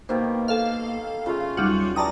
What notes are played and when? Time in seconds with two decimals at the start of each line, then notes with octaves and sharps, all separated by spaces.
0.09 B2 D#3 A#3 G4 C5
0.48 A4 F5
1.26 C#3 A3 F4
1.57 D#2 F#3 G3 D#4 F#4 F6
1.96 E3 D5 G5 A5 A#5 D6 D#6